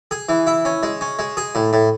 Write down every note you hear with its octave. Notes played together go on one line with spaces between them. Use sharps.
G#4
E3
E4
C#4
G#3
C#4
G#3
G#4
A2
A2